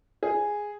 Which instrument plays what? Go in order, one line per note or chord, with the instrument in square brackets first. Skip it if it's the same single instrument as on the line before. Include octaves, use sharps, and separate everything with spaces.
[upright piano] G#4